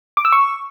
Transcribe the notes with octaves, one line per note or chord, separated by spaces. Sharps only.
D6
E6
C#6